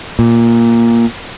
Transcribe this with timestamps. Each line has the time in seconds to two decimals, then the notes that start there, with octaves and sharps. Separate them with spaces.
0.19 A#2